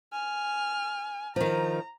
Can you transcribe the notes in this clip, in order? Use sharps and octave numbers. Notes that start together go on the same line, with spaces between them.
G#5 F6
D#3 F3 A#5